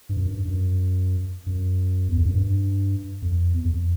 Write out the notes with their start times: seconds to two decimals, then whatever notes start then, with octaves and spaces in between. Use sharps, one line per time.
0.09 G2
0.17 F#2
0.31 G2
0.45 F#2
1.46 F#2
2.09 E2
2.18 F2
2.26 F#2
2.35 G2
3.22 F2
3.54 E2
3.66 F2